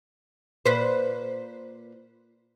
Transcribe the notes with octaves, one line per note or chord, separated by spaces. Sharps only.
A#2 B4 C5